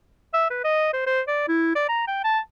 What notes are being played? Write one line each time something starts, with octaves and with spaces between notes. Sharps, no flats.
E5
B4
D#5
C5
C5
D5
E4
D5
A#5
G5
A5